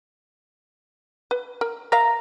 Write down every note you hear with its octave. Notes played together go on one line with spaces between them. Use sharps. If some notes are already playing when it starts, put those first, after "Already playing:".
B4
A#4
A#4 E5 F5 A#5